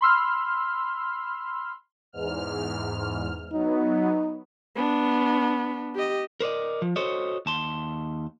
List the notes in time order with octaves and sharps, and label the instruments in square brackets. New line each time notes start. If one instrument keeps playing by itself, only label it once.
[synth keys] B5 C6 E6 F6
[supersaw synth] E2 G#2 F6
[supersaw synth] F#3 B3 [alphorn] D#4
[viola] B3 D4
G4 D#5
[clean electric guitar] A#4 C5 D5 D#5
F3
F#4 A4 C5 C#5 D#5
D#2 A5 C6